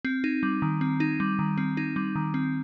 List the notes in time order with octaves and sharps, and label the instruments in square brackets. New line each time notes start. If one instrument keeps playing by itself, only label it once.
[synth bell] C4
D#4
G3
D#3
C4
D#4
G3
D#3
C4
D#4
G3
D#3
C4